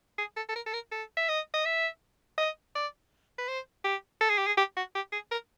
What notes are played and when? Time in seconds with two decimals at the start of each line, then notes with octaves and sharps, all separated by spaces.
0.18 G#4
0.36 A4
0.49 A4
0.55 A#4
0.66 A4
0.74 A#4
0.92 A4
1.17 E5
1.29 D#5
1.54 D#5
1.65 E5
2.38 D#5
2.75 D5
3.38 B4
3.48 C5
3.84 G4
4.21 A4
4.30 G#4
4.38 G4
4.47 G#4
4.57 G4
4.77 F#4
4.95 G4
5.12 G#4
5.31 A#4